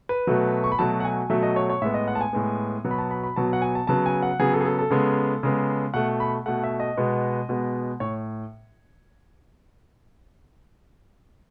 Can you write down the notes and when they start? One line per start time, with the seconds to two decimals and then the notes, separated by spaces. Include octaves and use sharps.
0.09 B4
0.27 B2 F#3 A3
0.64 C#6
0.72 B5
0.79 B2 F#3 A3 A5
1.00 F#5
1.05 G#5
1.30 B2 F#3 A3 E5
1.43 D#5
1.56 C#5
1.69 C#5
1.82 A2 G#3 B3 E5
1.94 D#5
2.08 F#5
2.15 A5
2.21 G#5
2.33 A2 G#3 B3
2.84 B2 F#3 B3
2.91 B5
2.98 A5
3.11 B5
3.23 B5
3.36 B2 F#3 B3 A5
3.53 F#5
3.62 G#5
3.75 A5
3.87 C#3 F#3 B3 A5
4.06 G#5
4.22 F#5
4.39 C#3 F#3 B3 G#4
4.53 A4
4.61 G#4
4.65 A4
4.79 A4
4.91 C#3 G#3 B3
5.43 C#3 G#3 B3
5.94 B2 A3 F#5
6.20 B5
6.46 B2 A3 F#5
6.64 E5
6.80 D#5
6.97 B2 G#3 B3
7.49 B2 G#3 B3
8.00 A2 C#5